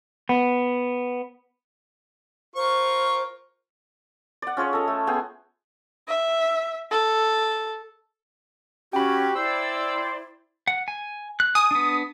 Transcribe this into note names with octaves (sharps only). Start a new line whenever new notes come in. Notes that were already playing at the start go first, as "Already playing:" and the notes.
B3
F4 A#4 C5 C#6
D5 F#5
C#4 F4 G#4 C#5
A4 D#5
A3
B3 G#4 G5 G#5
E5
A4
C#4 F#4 G4 G5 B5
E4 C5 D5 E6
F#5
G#5
F#6
G#5 D#6
B3 D4